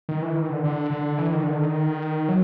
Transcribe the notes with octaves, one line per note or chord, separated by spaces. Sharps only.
D#3
E3
D#3
D3
D3
D3
E3
D#3
D3
D#3
F#3